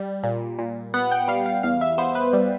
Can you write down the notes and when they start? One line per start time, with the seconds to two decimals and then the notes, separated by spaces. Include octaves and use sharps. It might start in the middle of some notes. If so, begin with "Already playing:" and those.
Already playing: G3
0.23 A#2
0.59 A#2
0.94 B3 F#5
1.12 G5
1.28 G3 F5
1.46 F5
1.63 E2 F5
1.81 E5
1.98 B3 C5
2.15 B4
2.33 G3